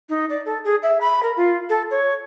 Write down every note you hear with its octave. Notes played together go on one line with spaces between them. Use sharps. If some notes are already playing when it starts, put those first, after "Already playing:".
D#4
D5
A4
G#4
E5
B5
A#4
F4
A4
C#5